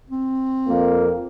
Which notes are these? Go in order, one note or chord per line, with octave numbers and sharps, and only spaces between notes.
C4
F2 A#3